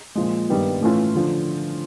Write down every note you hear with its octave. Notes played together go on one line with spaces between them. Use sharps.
A#2 F3 G#3
G2 D#3 G3 B3
A2 E3 A3 C#4 F4
D3 F3